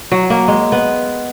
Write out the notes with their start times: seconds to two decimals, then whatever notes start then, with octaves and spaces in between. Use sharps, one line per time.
0.12 F#3
0.30 A#3
0.48 G#3
0.72 B3